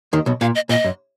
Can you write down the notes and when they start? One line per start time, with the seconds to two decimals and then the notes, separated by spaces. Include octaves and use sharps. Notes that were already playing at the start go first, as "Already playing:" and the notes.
0.13 D#2 D#3
0.26 B1 B2
0.41 A#2 F5
0.55 D#5
0.69 A#2 D#5
0.84 F#2